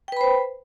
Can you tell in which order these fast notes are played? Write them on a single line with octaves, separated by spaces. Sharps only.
G5 B4 B5 C5